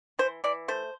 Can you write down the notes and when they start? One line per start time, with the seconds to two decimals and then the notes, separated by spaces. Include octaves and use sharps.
0.19 E3 C5
0.44 E3 D5
0.68 A3 C5